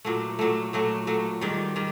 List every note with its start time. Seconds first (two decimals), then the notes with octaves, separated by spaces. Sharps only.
0.05 A#2 F#3 A3
0.39 A#2 F#3 A3
0.73 A#2 F#3 A3
1.07 A#2 F#3 A3
1.41 G#2 D#3 G3
1.76 D#3 G3